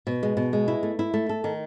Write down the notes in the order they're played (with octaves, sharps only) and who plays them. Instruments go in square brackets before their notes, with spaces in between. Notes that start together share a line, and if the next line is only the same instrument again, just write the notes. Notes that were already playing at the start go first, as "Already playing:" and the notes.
[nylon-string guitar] B2
G#3
B2
G#3
E4
A3
E4
A3
A4
D#3